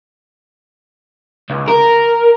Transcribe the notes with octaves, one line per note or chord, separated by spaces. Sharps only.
C#2
A#4